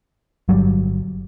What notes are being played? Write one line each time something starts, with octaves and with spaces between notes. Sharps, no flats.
G1 F#3 G3